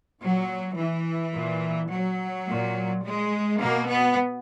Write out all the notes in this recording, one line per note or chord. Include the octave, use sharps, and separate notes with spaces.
A#2 F#3
E3
A#2
F#3
A#2
G#3
B2 A#3
B3